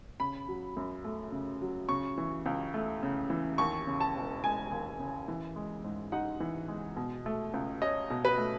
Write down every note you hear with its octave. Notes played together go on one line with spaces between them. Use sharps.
C#3 B5
F#3
F#2
A3
C#3
F#3
C#3 C#6
E3
C#2
A3
C#3
E3
D#2 C#6
C#3
A5
E1
G#3 G#5
D#2
C#3
E3
G#3
G#2
D#4 F#5
E3
G#3
B2
A3
C#2
C#4 D#5
B2
B4
A3